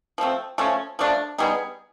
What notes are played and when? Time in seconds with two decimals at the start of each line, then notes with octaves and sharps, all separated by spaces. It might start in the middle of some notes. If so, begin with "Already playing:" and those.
0.18 F3 A3 C4
0.58 F3 A3 C#4
0.99 F3 A3 D4
1.38 G3 B3 D#4 G#4